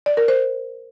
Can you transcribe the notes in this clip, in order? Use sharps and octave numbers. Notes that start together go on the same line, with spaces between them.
D5
A#4
C5